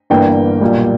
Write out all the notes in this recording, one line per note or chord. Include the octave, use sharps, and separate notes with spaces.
G1 G2 E3 A#3 G5
B1 A#2 G3 A#3